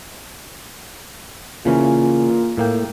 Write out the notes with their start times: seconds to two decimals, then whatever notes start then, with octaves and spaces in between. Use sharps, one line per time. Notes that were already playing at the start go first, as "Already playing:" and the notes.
1.65 A#2 C#3 E3 C#4
2.57 A2 A#3 G5